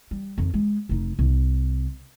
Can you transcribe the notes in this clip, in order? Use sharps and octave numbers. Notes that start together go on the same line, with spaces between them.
G3
F2 D#3
G#3
F1 D#4
C2